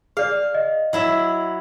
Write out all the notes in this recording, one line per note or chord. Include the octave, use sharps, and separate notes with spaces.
G#4 D5 F5
D#5
F#3 E4 E5